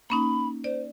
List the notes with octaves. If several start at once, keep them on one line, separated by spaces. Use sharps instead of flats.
A#3 C#4 D#4 B5
C5 D5